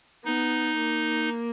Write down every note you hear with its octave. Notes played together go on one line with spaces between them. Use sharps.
B3 D#4
A#3